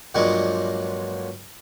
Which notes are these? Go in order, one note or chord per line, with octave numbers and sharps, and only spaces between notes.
G2 A#2 F3 F#3 G#3